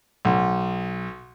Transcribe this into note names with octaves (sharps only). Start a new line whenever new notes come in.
B1